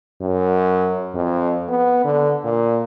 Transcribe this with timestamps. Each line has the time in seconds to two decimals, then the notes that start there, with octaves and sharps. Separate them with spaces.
0.22 F#2
1.14 F2
1.69 B3
2.05 D3
2.44 A#2